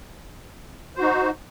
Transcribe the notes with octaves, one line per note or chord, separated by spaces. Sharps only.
D#4 F#4 C5